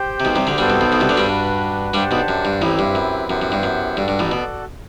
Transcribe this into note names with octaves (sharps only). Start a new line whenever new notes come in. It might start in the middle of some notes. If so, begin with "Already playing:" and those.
Already playing: G4 C5 G5
C3
B1 B2
C2 C3
D2 D3
G2 G3 B3 F#4 A4 C5
C2 C3
B1 B2
B1 B2
C2 C3
D2 D3
G2 G3
D4 F#4 B4
G2 G3 D4 G4 C5 F#5 A5
B1 B2
F#2
G2
A1 A2 C4 E4 G4 B4
G2
F#2
F#2 B3 E4 G4 C5 F#5
F#2
G2
F#2
G2 F#4 A4 D5
G2
A1 A2
B2